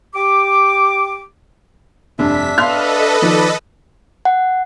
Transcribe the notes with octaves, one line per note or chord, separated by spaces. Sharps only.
G4 D6
F1 G2 D4 E5 B6
A4 B4 D#5 F5 C6 F6
D#3 F3 D5 B5
F#5